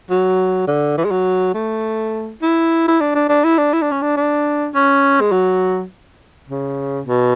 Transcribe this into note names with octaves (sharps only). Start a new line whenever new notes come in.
F#3
D3
E3
G#3
F#3
A3
E4
E4
D4
D4
D4
E4
D4
E4
D4
C#4
D4
D4
C#4
G#3
F#3
C#3
B2